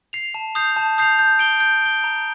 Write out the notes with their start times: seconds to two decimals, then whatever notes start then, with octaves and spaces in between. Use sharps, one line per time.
0.13 C7 F7
0.34 A5
0.55 D#6 G6 C7 F7
0.76 A5
0.98 D#6 G6 C7 F7
1.19 G6
1.39 D7 G7
1.60 G6
1.82 D7 G7
2.04 A#5